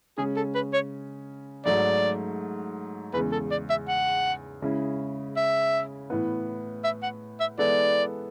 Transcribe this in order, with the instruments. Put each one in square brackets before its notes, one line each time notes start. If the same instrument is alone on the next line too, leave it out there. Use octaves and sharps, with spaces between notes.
[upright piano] C#3 G#3 C#4 [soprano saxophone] G#4
[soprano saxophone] A4
B4
C#5
[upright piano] G#2 F#3 A3 [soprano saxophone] D5
[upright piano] E2 [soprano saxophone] B4
[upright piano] C#3 G#3
[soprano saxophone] A4
D5
E5
F#5
[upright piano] C#3 G#3 C#4 E4
[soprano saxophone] E5
[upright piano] A2 E3 B3
[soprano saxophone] E5
F#5
E5
[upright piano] E3 G#3 B3 E4 A4 [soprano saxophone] D5